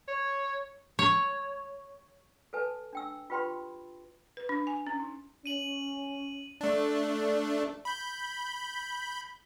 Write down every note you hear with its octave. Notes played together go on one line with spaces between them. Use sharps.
C#5
C#5
A4 B4 G#5 A5
D4 G5 E6
F4 G4 B4 G5 B5 C6
B4
D4
G#5
C#4
D#4
C#4 D#7 F#7
A3 D4
B5 G6